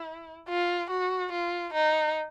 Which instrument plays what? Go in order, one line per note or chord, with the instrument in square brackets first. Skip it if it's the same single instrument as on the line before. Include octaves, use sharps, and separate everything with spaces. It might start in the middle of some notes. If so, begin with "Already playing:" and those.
Already playing: [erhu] E4
F4
F#4
F4
D#4